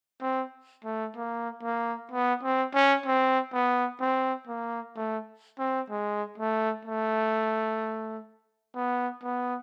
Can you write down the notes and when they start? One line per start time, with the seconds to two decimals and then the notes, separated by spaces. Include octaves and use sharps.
0.22 C4
0.84 A3
1.16 A#3
1.63 A#3
2.11 B3
2.43 C4
2.74 C#4
3.06 C4
3.53 B3
4.00 C4
4.47 A#3
4.96 A3
5.59 C4
5.90 G#3
6.38 A3
6.85 A3
8.75 B3
9.23 B3